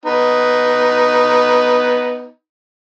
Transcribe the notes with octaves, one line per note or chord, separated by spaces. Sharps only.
B3 D#4